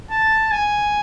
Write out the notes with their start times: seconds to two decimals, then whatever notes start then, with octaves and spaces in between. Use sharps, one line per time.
0.11 A5
0.51 G#5